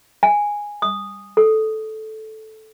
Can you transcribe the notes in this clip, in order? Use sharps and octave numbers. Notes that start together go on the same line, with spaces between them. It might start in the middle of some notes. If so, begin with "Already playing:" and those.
G#5
D#6
A4